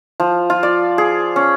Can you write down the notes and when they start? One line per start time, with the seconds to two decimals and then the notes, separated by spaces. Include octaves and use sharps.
0.20 F3
0.50 F4
0.63 D5
0.98 G#4
1.36 C#4